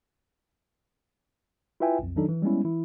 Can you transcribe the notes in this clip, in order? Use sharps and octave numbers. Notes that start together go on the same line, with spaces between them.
E4 F4 B4 E5 G5 G#5
B1 F2
D#3 F#3 D4 D#4 A4
E3
G3 G#3 B3 C#4 E4
E3 E4